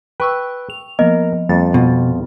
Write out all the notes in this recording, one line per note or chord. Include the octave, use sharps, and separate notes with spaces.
B4 G5 C#6 E6
F7
F3 A#3 B3 A#4 D#5
F2 G3 A#3 A6
B2 B3 F4